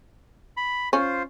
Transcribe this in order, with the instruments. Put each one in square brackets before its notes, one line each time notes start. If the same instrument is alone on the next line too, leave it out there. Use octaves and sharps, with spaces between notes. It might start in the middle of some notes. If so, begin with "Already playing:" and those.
[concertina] B5
[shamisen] C#4 [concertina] F4 C5